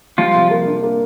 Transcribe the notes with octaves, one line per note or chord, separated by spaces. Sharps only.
F3 G3 F4
C3
A#3
D4
A#3